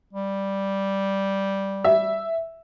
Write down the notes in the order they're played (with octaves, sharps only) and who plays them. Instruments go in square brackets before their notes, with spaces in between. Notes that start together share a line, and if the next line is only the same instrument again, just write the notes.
[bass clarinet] G3
[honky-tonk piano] E5